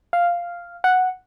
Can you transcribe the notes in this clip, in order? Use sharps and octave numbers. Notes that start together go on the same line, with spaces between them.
F5
F#5